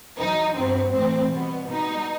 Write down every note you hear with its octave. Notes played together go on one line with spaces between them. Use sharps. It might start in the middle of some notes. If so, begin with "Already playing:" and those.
E2 B2 F#3 D#4
G2 F#3 B3 C4
A2 E3 A3 C4
B2 G3 B3
B2 G3 B3 D#4